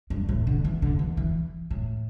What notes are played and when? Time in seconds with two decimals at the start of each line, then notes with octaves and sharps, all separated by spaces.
0.10 G2
0.29 A2
0.47 D3
0.65 E3
0.82 D3
0.99 E3
1.17 E3
1.71 A2